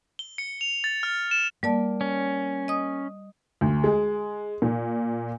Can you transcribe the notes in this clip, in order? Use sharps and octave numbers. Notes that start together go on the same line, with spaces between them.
G7
C#7
F7
A6
F6
E7
G3 A#3 D5 A5
C#4
D#5 D#6
D2
G#3
A#2